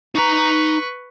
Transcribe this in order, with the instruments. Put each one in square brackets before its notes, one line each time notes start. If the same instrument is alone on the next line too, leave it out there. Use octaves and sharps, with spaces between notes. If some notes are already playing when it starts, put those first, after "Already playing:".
[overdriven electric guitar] D#4 A#5 [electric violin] B4 C#6